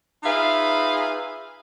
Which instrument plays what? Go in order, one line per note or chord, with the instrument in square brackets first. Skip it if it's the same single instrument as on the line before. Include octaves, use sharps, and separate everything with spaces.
[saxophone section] D#4 F4 G#4 B4 E5 F5